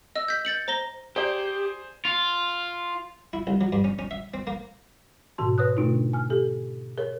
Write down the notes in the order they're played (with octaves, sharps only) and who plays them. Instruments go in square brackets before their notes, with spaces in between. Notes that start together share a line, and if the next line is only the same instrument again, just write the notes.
[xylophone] D#5 E6
G6 B6
G6 A6 C#7 F#7
C5 A#5 A#6 G7
[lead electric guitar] G4 [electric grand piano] G#4 C5 [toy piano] D5 A#5
[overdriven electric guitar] F4
[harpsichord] E4
C2
F#3
G2
C#4
C#4
E5
C4
A#3
[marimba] G#2 B2 D#3 F#4 A5 C6
B4 C#5 D#6 F#6
B2 D3 A3 D4 D#4 F4
G#5 F6
G4 A4
G#4 A#4 C#5